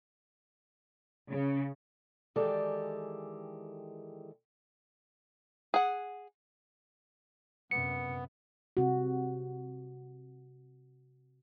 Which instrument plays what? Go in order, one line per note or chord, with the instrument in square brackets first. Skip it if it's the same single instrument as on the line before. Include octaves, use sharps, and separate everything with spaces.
[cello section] C#3
[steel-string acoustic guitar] D#3 E3 G#3 G4 A4 D5
[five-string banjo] G#4 F#5
[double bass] F#2 C3 [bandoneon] B3 [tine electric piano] C#7
[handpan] C3 F#4